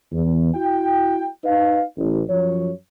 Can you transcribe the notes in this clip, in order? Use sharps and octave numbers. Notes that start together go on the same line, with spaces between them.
E2
E4 F#4 G5
D#4 B4 D#5 F5
A1
F#2 F3 C#5